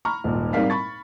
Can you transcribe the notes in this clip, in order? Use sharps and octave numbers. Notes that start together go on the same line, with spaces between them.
A#5 B5 C#6 F6
D#1 G#1 A#2
G#2 G3 C4 A#4 F5 B6
B5 C#6 A6